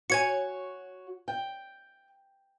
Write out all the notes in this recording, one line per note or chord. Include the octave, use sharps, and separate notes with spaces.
F#4 C#5 G#5 G#6 C#7
G5